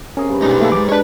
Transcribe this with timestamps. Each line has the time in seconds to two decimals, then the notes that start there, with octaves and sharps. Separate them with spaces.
0.17 C3 C#4 G#4 A#4
0.29 G2 B4
0.42 B2 G#3 D#4 C#5
0.60 A3 A#3 A4
0.72 E2 G#2 D6
0.89 G#3 D4 B4 C#5